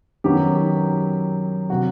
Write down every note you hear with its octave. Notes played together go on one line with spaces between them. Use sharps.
F#2 D#3 F#3 B3 G4
C3 F#3 F#4